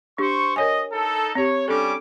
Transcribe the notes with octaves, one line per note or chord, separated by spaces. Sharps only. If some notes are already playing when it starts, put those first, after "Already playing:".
D4 G4 C5 C#6
A#4 C#5 D#5 G#5
D#4 A4
C4 G4 C#5
G3 C#4 D4 A4 D6